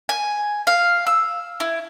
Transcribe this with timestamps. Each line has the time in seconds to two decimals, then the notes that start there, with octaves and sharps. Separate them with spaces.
0.09 G#5
0.67 F5
1.07 E6
1.60 E4